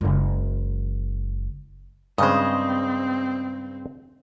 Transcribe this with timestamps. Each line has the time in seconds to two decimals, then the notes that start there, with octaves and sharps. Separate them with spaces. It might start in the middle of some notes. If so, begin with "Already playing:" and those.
0.01 F#1 G#3
2.18 G2 C#3 G#3 C4 C5 D#5